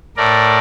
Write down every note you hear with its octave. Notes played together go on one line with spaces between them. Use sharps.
A2 A3 A#4 D5